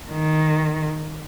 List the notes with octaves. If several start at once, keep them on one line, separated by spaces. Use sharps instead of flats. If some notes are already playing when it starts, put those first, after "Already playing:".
D#3